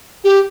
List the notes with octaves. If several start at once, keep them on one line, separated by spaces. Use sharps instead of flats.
G4